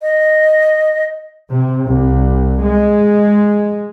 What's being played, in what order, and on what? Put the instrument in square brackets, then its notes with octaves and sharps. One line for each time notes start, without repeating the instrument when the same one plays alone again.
[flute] D#5
[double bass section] C3
C2
G#3